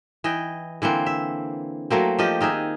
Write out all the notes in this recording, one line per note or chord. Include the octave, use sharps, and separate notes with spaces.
E3 D#5 G5
D3 E3 A#3 C4
E5
F#3 A3 A#3 C4
F3 G4 D#5
D#3 D#4 G#4 E5